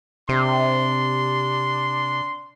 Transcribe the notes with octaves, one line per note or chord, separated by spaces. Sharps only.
C3 D4 C6